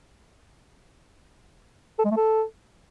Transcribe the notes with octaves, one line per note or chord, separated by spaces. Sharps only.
A4
G#3
A3
A4